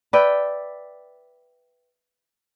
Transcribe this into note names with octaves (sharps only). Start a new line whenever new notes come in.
B4 D5 E5 G5